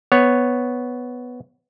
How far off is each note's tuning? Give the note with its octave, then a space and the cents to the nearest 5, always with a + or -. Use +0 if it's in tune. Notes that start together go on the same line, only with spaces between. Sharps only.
B3 +0 C#5 +0